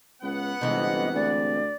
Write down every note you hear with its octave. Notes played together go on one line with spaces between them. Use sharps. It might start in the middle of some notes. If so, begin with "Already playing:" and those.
C#2 B3 F#5
G1 C3 E3 G#3 D#5
D2 D5